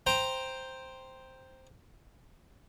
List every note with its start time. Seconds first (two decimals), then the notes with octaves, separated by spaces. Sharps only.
0.07 C5 G5 A#5